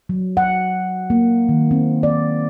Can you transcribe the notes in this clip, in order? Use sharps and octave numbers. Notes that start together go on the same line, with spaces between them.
F#3
F#5
A#3
D#3
C4
D5